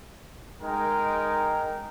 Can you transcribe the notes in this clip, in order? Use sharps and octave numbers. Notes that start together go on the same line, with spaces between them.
G#3 D#4 A#4 G5